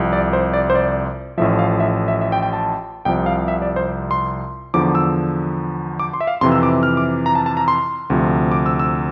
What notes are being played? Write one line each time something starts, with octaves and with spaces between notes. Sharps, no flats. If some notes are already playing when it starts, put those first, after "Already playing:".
Already playing: C2 C3 F3
D5
C5
D5
C5
D5
A1 A2 F3 E5
F5
E5
E5
E5
G5
G5
A5
C2 C3 F3 G5
F5
E5
D5
C5
C6
E2 D3 F3 D6
E6
D6
C6
E5
F5
F2 C3 E3 C6
E6
D6
F6
D6
A#5
A5
A5
A#5
C6
D2 C3 F3
D6
E6
E6